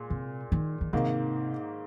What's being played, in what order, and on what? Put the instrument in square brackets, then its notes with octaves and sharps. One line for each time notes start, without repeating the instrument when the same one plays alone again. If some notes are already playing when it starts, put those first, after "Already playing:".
Already playing: [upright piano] A#2 G#3
[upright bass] C3
D#3
D#3
[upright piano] G#2 D#3 A#3 [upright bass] C3